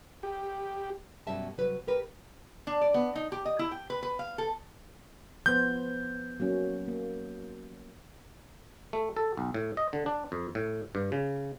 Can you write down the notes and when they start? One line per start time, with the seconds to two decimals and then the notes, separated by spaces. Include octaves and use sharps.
0.23 G4
1.27 F#2 B2 G3 C#4 E5 A5
1.58 C3 F#3 G3 B4
1.87 G4 A#4 B4
2.67 D4
2.81 D5
2.94 B3
3.16 D#4
3.32 G4
3.45 D#5
3.59 E4
3.71 G5
3.90 B4
4.03 B4
4.19 F5
4.38 A4
5.46 F3 B3 C5 G6
6.40 F#3 A#3 C#4
6.88 A#3
8.93 A3
9.17 A4
9.37 B1
9.54 A2
9.77 D#5
9.93 D3
10.06 D4
10.32 F2
10.55 A2
10.95 G2
11.12 C#3